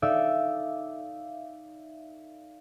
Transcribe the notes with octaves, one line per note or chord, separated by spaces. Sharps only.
D#4 A4 D5 E5 F5 D6